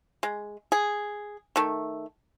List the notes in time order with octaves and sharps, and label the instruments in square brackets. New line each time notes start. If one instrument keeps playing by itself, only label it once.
[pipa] G#3
G#4
D#3 A3